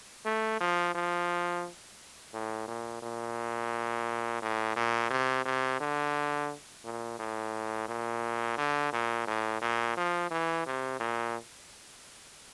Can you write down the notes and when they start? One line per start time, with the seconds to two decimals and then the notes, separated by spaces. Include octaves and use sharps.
0.25 A3
0.61 F3
0.95 F3
2.33 A2
2.68 A#2
3.03 A#2
4.42 A2
4.76 A#2
5.10 C3
5.45 C3
5.81 D3
6.84 A#2
7.19 A2
7.88 A#2
8.58 D3
8.93 A#2
9.28 A2
9.62 A#2
9.97 F3
10.31 E3
10.66 C3
11.00 A#2